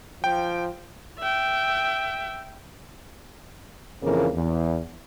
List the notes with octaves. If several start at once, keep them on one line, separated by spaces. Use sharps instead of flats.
F3 G5
E5 G5
F2 C#3 E3 A#3
E2